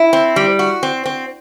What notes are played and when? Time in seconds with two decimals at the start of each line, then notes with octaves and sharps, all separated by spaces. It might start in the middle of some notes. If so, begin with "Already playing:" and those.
Already playing: E4
0.13 C4
0.36 G3
0.59 F#4
0.83 C4
1.06 C4